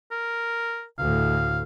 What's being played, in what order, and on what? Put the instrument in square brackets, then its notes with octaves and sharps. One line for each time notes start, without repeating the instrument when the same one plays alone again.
[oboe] A#4
[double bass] D2 A2 [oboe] F5